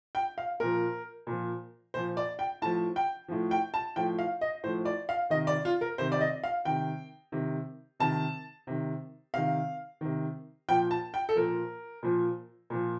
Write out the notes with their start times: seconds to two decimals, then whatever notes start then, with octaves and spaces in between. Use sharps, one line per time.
0.15 G5
0.38 F5
0.60 A#2 F3 A#4
1.27 A#2 F3
1.94 A#2 F3 C5
2.17 D5
2.39 G5
2.62 A2 F3 A5
2.96 G5
3.28 A2 F3
3.51 G5
3.74 A5
3.96 A2 F3 G5
4.18 F5
4.41 D#5
4.64 A2 C5
4.66 F3
4.85 D5
5.09 F5
5.30 C3 D#3 D#5
5.47 D5
5.65 F4
5.81 A#4
5.98 C3 D#3 C5
6.12 D5
6.21 D#5
6.43 F5
6.65 C3 D#3 G5
7.32 C3 D#3
8.00 C3 D#3 A5
8.67 C3 D#3
9.34 C3 D#3 F5
10.01 C3 D#3
10.69 A#2 F3 G5
10.91 A5
11.14 G5
11.29 A4
11.35 A#2 F3 A#4
12.03 A#2 F3
12.70 A#2 F3